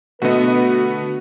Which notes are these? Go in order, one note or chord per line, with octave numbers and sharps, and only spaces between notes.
B2 D3 A3 B3 F#4 B4 D#5